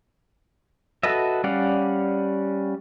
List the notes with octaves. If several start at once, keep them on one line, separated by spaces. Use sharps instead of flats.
F#4 A4 B4 D#5 E5
G3 C#4 D5 F5 F#5